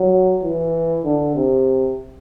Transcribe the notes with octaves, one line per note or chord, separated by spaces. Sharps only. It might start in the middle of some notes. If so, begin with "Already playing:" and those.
Already playing: F#3
E3
D3
C3